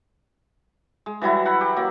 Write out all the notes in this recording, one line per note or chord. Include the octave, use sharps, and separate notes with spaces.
G#3
E3 F#3 G3 E4
F#5 B5
G4
F#3 A#3